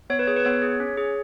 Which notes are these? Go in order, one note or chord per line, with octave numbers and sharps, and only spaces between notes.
B3 C#5
B4
G#4 C#5
B4
B3 C#5
G#4
C#4
G#4